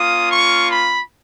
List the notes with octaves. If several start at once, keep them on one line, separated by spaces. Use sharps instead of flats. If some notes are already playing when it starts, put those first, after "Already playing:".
Already playing: A#3 C#4 F4 D#6
C#6
B5